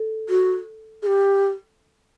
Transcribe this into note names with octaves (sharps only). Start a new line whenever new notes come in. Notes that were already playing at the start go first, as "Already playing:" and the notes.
Already playing: A4
F#4
G#4
G4